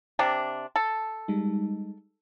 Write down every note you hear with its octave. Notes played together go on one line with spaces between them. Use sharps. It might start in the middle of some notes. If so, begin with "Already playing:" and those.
C3 D4
A4
G3 G#3 D#4